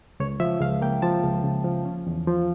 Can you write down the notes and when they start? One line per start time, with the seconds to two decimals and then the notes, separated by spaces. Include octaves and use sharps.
0.20 C#2 C#5
0.40 F3 E5
0.61 C#2 F5
0.82 A#3 G5
1.02 F3 A5
1.24 C#2
1.43 C#3
1.64 F3
1.85 C#4
2.06 E2
2.27 F3